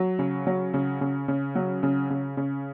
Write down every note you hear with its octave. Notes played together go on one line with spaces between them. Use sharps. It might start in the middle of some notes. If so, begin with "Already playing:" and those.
Already playing: F#3
C#3
F#3
C#3
C#3
C#3
F#3
C#3
C#3
C#3